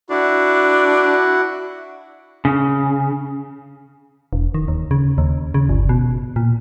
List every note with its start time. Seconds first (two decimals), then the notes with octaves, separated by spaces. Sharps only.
0.10 D4 E4 F#4
2.45 C#3
4.33 E1
4.54 D#3
4.68 D#2
4.91 C#3
5.18 D#2
5.54 C#3
5.69 G1
5.89 B2
6.36 A#2